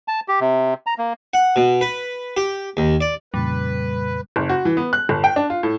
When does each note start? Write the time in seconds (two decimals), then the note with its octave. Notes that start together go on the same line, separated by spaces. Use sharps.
0.08 A5
0.28 G4
0.40 C3
0.87 A#5
0.98 A#3
1.34 F#5
1.56 B2
1.81 B4
2.37 G4
2.77 D#2
3.01 D5
3.34 F2 A#2 C#3 G3 B4
4.36 F#1
4.49 F#4
4.65 E3
4.77 B3
4.93 F#6
5.09 G1
5.24 G5
5.36 D4
5.50 F4
5.63 A2